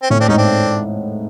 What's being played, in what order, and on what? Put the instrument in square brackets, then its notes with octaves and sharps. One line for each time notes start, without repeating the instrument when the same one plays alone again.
[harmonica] C4
[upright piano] A2 [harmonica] C#4
[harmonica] C4 D4
[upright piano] G#2 [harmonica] C#4 D#4
[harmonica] C4 D4